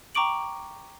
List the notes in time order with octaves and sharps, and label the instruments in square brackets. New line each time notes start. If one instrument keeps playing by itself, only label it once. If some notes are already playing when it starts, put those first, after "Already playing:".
[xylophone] G5 A#5 C#6 D6 D7 F#7